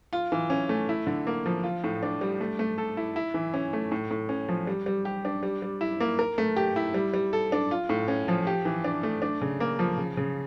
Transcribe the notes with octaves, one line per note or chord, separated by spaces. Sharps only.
F4
E3
C#4
A3
E4
D3
A#3
F3
F4
A2
D4
G3
A3
A3
A4
E4
E4
E3
C#4
A3
A2
A2
C#4
F3
G3
G3
G4
D4
G3
G3
E4
A#3
A#4
A3
G4
E4
G3
G3
A4
D4
F4
A2
C#4
F3
G4
E3
D4
A3
D4
C#3
A#3
F3
C#3
C#3